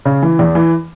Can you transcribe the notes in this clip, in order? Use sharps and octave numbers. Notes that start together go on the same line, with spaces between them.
C#3
E3
E2
E3